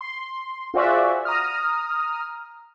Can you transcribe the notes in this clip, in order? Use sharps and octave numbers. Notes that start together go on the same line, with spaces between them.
C6
F4 F#4 G#4 C5 D5 E5
A#5 D#6 F6